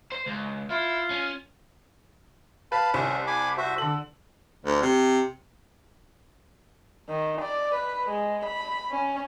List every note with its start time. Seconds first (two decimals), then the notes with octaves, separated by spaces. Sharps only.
0.12 C5
0.27 C#2
0.71 E4 F4
1.11 C#4
2.72 B4 F5 A5 B5
2.94 C2 C#4 C5 E5
3.27 G#5 B5 D6
3.57 F#4 C5 E5
3.78 D3 A4 F#7
4.66 D2
4.82 C3
7.09 D#3
7.41 D5
7.75 B4
8.09 G#3
8.45 B5
8.91 C#4